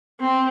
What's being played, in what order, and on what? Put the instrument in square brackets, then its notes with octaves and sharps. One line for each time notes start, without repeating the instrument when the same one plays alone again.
[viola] C4